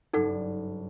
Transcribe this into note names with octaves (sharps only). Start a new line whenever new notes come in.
F#1 G2 D#4 A4 D5 F#5